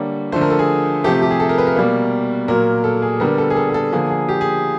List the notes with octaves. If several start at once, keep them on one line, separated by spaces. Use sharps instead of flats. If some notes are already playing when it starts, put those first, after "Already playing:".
Already playing: D3 G3 A#3 C#5
D3 F3 A3 C5
A#4
A4
G#4
C3 F3 A3 G4
G4
G#4
A4
A#4
B4
A#4
B2 G3 A#3
A#2 F#3 A#3 A#4
A4
G#4
D3 G3 B3 A#4
A4
G#4
A4
G#4
A4
D3 F3 A#3 G#4
G#4
G4
G#4